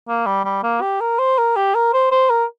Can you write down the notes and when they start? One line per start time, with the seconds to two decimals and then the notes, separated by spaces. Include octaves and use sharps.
0.08 A#3
0.26 G3
0.45 G3
0.63 A#3
0.82 G4
1.01 A#4
1.19 C5
1.38 A#4
1.56 G4
1.75 A#4
1.94 C5
2.12 C5
2.30 A#4